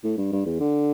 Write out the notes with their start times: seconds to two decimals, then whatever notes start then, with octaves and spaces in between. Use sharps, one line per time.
0.04 A2
0.18 G2
0.32 G2
0.46 E2
0.60 D3